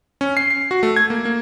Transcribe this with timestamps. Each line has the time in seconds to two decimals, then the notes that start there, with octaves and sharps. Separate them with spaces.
0.21 C#4
0.37 C7
0.50 C7
0.71 F#4
0.83 A3
0.96 G#6
1.10 A#3
1.25 A#3